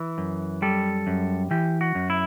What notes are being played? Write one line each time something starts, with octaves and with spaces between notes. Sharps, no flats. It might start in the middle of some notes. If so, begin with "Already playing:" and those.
Already playing: E3
F#2
G3 A4
F#2
E3 G4
F#4
F#2
E4